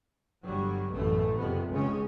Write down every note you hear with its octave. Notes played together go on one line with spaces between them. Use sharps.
G1 F#3 G3
A1 F#2 B2 A3
F#1 F2 C3 B3
F1 C#2 C#3 G#3 C#4